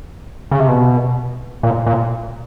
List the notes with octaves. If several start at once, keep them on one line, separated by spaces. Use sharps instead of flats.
C#3
C3
B2
A#2
A#2